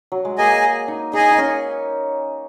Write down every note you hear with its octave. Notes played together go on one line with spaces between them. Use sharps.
F#3
G#3
A#3 G#4 D#5 G#5
D#4
D#4 G#4 D#5 G#5
D#4
C#4